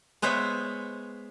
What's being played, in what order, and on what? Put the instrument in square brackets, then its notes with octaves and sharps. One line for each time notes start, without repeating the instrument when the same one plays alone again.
[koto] G#3 B3 C5 C#5 E5